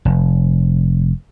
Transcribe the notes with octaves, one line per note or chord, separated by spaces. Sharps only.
F1